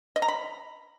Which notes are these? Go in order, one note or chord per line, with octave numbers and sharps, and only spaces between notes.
D#5
A#5
B5